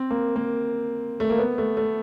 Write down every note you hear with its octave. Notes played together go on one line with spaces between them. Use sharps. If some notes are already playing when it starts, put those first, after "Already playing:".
Already playing: C4
A#3
A#3
A3
A#3
B3
A3
A3